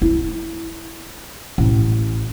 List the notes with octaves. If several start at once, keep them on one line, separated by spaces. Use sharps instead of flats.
E4
A1